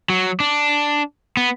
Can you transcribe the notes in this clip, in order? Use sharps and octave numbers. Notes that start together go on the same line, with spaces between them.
F#3
D4
B3